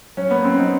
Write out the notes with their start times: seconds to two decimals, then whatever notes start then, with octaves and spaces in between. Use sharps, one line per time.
0.17 F#3 C#4
0.31 A#3 B3
0.44 C4 C#4
0.59 F#3 D#4